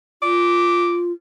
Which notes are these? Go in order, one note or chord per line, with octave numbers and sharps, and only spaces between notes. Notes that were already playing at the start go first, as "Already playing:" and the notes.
F4 D6